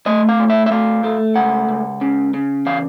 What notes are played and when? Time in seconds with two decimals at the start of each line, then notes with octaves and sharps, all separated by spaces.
0.06 A3 D#5
0.29 F5
0.39 A2
0.50 E5
0.66 E5
0.71 A3 F5
1.04 A3
1.36 C#2 F#5
1.69 C#2
2.01 C#3
2.34 C#3
2.66 E3 F5